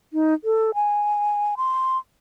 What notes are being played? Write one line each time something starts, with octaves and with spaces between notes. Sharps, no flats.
D#4
A4
G#5
C6